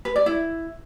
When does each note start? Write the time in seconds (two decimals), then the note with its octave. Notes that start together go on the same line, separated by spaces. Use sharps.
0.05 B4
0.16 D5
0.26 E4